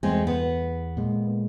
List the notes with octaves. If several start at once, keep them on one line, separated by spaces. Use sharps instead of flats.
E2 G#3 A3 C4
B3
A#2 G#3